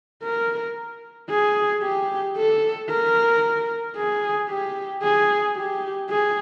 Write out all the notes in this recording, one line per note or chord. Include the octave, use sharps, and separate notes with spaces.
A#4
G#4
G4
A4
A#4
G#4
G4
G#4
G4
G#4